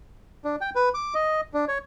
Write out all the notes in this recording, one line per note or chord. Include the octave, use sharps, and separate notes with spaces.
D4
G5
B4
D6
D#5
D4
C#5